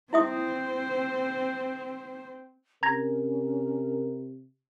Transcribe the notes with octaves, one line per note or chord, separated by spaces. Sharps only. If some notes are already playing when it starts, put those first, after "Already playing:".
C4 E4 C5 E5 D#6
C3 C#4 A#4 A#5 G#6 A#6